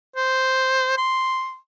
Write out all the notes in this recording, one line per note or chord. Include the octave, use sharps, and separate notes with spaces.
C5
C6